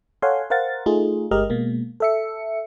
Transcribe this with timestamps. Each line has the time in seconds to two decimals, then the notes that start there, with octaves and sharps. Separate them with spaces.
0.22 A4 C#5 F5 F#5 G#5 C6
0.50 A#4 C5 F5 F#5 A6
0.86 A3 D#4 F4 G#4
1.31 G1 G#3 G4 A#4 D#5 F6
1.50 B2 G#3 A#3
2.00 A4 E5 C#7